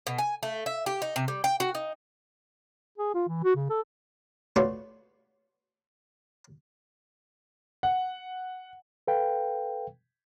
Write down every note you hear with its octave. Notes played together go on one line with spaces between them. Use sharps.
B2
G#5
A3
E5
G4
D#4
C3
G3
G5
F#4
D#4
G#4
F4
E3
F#4
C#3
A4
A3 B3 F4 F#4 C#5 D5
F#5
A4 B4 F5 G5